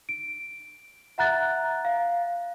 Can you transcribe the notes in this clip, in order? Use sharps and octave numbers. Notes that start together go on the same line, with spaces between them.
D7
E5 F#5 A#5 F#6 A6
F5